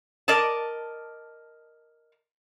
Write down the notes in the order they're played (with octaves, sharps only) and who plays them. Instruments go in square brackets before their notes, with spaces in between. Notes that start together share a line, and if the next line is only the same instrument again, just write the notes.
[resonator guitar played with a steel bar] A#4 D5 D#5 A5